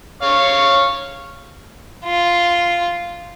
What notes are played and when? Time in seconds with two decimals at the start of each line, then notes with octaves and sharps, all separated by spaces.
0.22 C#5 F5 C#6
2.05 F4